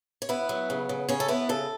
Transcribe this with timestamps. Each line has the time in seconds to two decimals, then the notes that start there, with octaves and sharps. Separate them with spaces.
0.22 C#5
0.29 B3 E4 B4
0.49 F#3
0.70 C#3
0.89 C#3
1.09 C#3 C#4 C#5
1.20 A4
1.28 B3 E4 B4
1.49 C#3 A4